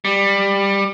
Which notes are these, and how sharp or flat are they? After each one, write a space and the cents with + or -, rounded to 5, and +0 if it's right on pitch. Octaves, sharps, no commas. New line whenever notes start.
G3 +15